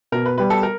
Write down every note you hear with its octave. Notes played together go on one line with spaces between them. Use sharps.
B2 A#4
B4
G3 B3 B4
A4
A#4